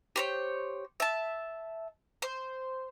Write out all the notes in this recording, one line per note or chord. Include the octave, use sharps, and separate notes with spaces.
G4 C5 C#5
E5 A5
C5